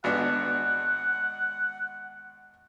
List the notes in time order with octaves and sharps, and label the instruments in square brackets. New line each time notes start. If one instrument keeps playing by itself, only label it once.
[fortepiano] G#1 B3 D4 [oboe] F#5